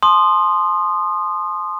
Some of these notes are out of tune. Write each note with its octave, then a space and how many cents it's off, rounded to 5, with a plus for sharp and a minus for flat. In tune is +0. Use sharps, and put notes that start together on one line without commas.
A5 -45 C6 +5 D#6 -20